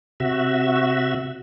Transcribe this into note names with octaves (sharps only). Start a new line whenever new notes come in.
C3 F#4 E5